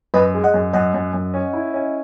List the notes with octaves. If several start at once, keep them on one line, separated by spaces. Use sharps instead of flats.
F#2 B4 D#5
G#3
D#5 F#5
F#2
F#2 D#5 F#5
F#2
F#2
C#4
E4
C#4